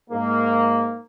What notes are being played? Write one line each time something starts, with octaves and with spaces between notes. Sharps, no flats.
G#2 A#3